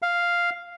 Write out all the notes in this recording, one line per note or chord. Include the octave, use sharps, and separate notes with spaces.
F5